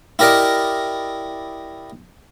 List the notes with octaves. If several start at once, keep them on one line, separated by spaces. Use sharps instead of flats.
E4 G4 A#4 D5 D#5